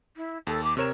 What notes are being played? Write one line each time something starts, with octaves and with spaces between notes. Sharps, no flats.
E4
D#2 A4
D6
C3 A#4 C#5 E7